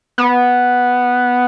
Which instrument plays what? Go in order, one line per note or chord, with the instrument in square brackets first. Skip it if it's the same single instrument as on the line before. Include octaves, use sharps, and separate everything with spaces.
[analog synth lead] B3